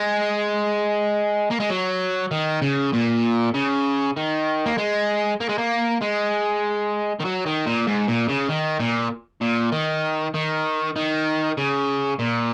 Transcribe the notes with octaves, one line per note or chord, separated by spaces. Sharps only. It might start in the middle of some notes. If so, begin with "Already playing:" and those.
Already playing: G#3
A#3
G#3
F#3
D#3
C#3
A#2
C#3
D#3
A#3
G#3
A#3
G#3
A#3
G#3
D#3
F#3
D#3
A#2
G#2
A#2
C#3
D#3
A#2
A#2
D#3
D#3
D#3
C#3
A#2